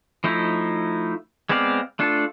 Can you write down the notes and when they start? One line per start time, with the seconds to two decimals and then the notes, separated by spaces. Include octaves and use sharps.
0.24 F3 A3 D#4 E4
1.49 G#3 B3 C4 D5 F5
1.99 A3 D4 F4 A4